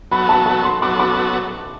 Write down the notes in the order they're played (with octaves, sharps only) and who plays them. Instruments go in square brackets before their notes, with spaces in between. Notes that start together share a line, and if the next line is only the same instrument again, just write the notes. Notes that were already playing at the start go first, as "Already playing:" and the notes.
[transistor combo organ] F#3 B3 F#4 A4 [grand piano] B5
[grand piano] A5
A5
C6
[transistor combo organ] F#3 B3 F#4 A4 [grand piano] D6
[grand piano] D6